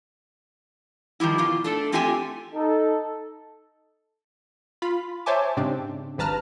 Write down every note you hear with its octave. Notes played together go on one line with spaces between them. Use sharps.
D#3 F3 G3 E4
B2 F4
A3 D4 A4
A3 C4 F4 G4 E5 G#5
D#4 A4
F4 B5
C5 C#5 E5 G#5 A5 D6
G#2 C#3 C4 D4 G4
G#1 G2 B4 A5 A#5 F6